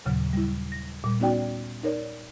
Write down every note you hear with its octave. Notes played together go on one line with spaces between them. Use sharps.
D#2 A#2 C#3 F#3
G3 E4
A#6
A#2 G3
B3 C#4 D#4 F#4 D5 G5
D#4 A#4 C#5 D5